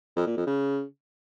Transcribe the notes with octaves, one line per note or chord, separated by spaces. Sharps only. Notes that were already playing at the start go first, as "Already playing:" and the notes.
F2
A#2
F2
C#3